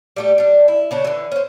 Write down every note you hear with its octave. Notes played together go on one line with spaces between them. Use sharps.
G3 A3 G4
G3 D4
E4
C#3 C#4 D4
D3 E3
C#4 C5